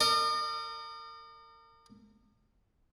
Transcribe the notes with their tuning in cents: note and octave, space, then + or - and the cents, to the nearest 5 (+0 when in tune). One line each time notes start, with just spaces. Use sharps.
A#4 -35 D#5 -45